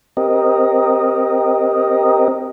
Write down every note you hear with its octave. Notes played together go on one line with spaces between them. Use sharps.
C4 G4 A#4 D#5